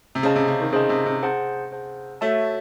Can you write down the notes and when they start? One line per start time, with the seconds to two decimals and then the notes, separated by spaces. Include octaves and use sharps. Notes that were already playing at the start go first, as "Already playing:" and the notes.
0.15 C3
0.23 C#3 G#4 C5 D#5 A5
0.36 C3
0.48 C#3
0.60 D#3
0.73 C#3 G#4 C5 D#5 A5
0.89 C3
1.06 C3
1.23 G#4 C5 F#5 A5
1.72 G#4 C5 F#5 A5
2.21 A3 F#4 C#5 E5 A5